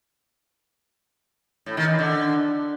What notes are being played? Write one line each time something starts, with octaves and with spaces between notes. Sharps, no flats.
A2
D#3
E3
D3